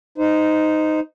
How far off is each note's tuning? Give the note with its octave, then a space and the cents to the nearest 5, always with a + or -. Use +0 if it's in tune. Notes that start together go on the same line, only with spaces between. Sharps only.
D#4 +0 C5 -25